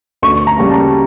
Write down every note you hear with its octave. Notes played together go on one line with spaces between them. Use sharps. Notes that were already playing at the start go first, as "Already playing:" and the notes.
D2 C#6
A#5
C#3 G3 A#3
A5